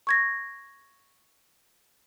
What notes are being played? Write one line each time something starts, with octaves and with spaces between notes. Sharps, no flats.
C#6 G#6 A#6